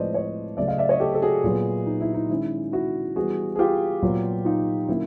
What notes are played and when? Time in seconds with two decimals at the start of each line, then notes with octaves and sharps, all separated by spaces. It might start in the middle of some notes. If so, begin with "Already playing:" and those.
Already playing: A2 F3 G#3 C4 B4 C5 D5 D#5
0.14 C#5 D#5
0.57 C#3 F#3 A3 D5 E5
0.68 D#5 F5
0.78 D5 E5
0.89 C#5 D#5
1.00 G4 A4
1.14 A4
1.22 F#4 G#4
1.44 A#2 F#3 B3
1.86 D#4
2.01 E4
2.14 D#4
2.29 D#3 G#3 C#4 E4
2.72 E4 F#4
3.16 E3 G3 B3 F#4 G#4
3.56 G#4
3.59 F4 G4
4.03 A#2 F#3 B3
4.45 D#4 F4
4.88 D3 F#3 A#3 C#4 E4